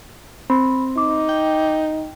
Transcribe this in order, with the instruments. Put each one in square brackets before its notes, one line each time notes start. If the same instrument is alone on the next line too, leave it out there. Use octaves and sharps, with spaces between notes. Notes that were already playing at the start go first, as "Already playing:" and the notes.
[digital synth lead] C4 [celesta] B5
[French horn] D#4 [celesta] D6
[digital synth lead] G5